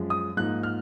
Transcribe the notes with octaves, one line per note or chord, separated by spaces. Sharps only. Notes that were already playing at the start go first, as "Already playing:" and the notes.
Already playing: F#2 F3 G#3
D#6
G#2 F3 A#3 D#4 F#6
F6